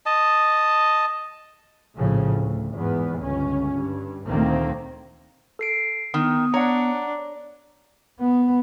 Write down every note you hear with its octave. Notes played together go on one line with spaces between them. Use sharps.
D#5 A5
A#1 A2 C#3 F3
D2
E2 G#2 B3
G1 C#2 C#4
G2
D2 A#2 D#3 A#3 C4
A4 C7 D7
D#3 B3 D#6
D4 C#5 F#5 A#5
B3